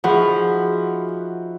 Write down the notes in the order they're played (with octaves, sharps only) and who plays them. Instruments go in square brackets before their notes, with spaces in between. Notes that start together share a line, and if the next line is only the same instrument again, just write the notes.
[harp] F3 [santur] D#4 F#4 E5 [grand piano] G#4 F#5 B5